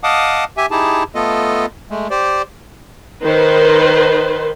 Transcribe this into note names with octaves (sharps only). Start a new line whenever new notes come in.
D#5 F5 F#5 A5 D6 D#6
G4 E5 G#5
D#4 E4 G4 G#4 A5
A3 B3 F4 A4 D#5
G#3 A3
G4 C5 D5
D#3 B4 C5